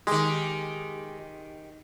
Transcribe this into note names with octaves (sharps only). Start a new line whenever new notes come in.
D#3 G#3 G4